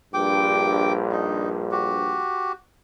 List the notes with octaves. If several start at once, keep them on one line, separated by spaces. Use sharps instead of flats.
A#1 G2 G5 D6
D#4
F#4 G4